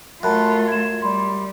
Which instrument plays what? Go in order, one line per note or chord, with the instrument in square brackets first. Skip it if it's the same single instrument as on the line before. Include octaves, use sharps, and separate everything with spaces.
[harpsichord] F#2 [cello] A3 F4 [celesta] A5 B5 F#6
[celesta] G#6 E7
[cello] G3 [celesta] D5 B5 C6